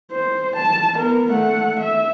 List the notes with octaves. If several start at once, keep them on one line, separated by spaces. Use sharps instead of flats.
C5
A5
B3 A#4
A3 F#5
E5